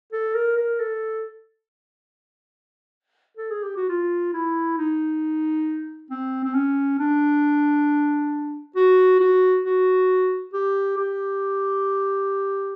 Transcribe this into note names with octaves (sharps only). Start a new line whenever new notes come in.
A4
A#4
A#4
A4
A4
G#4
G4
F#4
F4
E4
D#4
C4
C4
C#4
D4
F#4
F#4
F#4
G4
G4